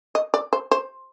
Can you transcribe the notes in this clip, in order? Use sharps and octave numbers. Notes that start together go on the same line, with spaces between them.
D#5
D5
C5
C5